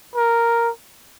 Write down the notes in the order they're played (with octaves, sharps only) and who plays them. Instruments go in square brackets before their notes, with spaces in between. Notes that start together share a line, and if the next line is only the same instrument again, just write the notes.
[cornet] A#4